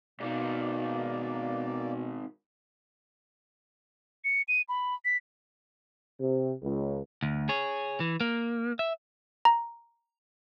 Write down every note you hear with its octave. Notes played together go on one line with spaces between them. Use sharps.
G#2 B2 D#3 A#3 D5
C#7
D#7
B5
B6
C3
C#2
D2
G#4 C#5
E3
A#3
E5
A#5